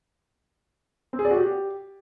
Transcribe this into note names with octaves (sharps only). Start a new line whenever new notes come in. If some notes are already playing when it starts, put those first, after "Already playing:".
C4
G#4
D5
F#4
G4